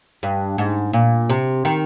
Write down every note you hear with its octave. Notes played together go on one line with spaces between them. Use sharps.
G2
G#2
A#2
C3
D#3